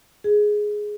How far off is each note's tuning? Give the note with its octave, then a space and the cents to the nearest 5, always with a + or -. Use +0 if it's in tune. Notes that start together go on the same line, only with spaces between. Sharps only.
G#4 +5